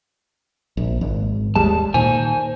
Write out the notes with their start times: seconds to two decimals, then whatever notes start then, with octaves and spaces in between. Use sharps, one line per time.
0.77 A#1
1.01 G#1
1.55 D#2 G3 G#3 A5
1.94 A#2 D#3 C5 G#5